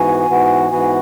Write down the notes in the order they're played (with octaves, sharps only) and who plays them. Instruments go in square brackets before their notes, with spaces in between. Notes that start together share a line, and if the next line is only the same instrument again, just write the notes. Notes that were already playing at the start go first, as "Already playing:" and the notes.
Already playing: [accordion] G#2 E3 B3 F#4 [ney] G#5
[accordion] G#2 E3 B3 F#4
[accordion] G#2 E3 B3 F#4 [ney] G#5